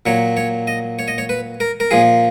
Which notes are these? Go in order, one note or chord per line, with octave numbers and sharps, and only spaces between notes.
A#2 F#3 C#5
C#5
D#5
C#5
D#5
C#5
B4
A#4
A#4
A#2 F3 G#4